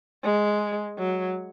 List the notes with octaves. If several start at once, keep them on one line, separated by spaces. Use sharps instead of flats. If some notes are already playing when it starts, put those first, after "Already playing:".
G#3
F#3